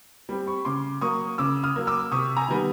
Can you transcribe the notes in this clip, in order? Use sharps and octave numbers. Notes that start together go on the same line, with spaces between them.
G3 C4
B5 C#6
C#3 C6 D6
F#3 A#3 C#6 D#6
C#3 D6 E6
D#6 F6
F#3 A#3
D6 E6
C3 C#6 D#6
G#5 A#5
D#3 G3 B3